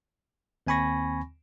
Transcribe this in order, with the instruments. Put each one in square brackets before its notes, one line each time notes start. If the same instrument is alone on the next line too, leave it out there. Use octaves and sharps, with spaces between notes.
[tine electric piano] D#2 C4 G#5 B5 C#6 A#6